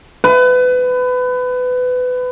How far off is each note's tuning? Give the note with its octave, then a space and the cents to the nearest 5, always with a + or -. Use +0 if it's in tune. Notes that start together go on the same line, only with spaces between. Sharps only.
B4 +25